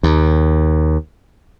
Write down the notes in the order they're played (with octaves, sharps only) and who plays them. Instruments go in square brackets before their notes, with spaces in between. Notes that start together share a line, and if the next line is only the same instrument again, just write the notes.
[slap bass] D#2